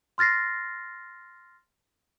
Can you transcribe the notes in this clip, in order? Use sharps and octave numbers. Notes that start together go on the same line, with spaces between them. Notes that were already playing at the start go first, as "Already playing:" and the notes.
C6 F6 A6 A#6 C7